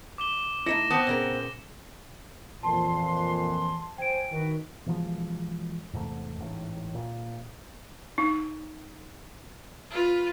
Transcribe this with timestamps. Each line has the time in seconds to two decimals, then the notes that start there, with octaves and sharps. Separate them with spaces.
0.18 D6 E7 G7
0.66 A3 D#4 E4 A#6 C#7 E7
0.90 B3 C4 A5
1.07 A#2 C#3 A#4
2.63 F2 A#2 E3 A5 C6
3.98 C5 G5 G#5 D7
4.31 D#3 F#4 B4
4.86 B2 E3 F3 G#3
5.93 E2 G#2 C3 A3
6.40 A1 G#2
6.95 A#2
8.18 D#4
9.90 F4 B4